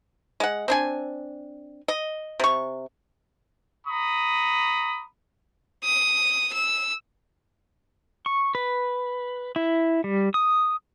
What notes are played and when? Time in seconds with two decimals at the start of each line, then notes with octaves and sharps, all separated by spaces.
0.40 G#3 F#5
0.68 C4 D4 G#5
1.88 D#5
2.40 C3 C#6
3.87 A#5 B5 C#6 D#6
5.84 D#6
6.53 E6
8.26 C#6
8.55 B4
9.56 E4
10.04 G3
10.34 D#6